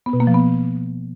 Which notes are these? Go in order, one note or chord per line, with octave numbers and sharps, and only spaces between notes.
B3
B2
A#3
F3
B3